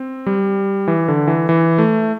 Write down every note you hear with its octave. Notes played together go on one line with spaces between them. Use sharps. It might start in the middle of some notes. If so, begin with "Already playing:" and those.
Already playing: C4
G3
E3
D3
E3
E3
A3